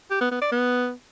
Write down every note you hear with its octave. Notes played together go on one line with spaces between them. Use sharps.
G4
B3
B3
D5
B3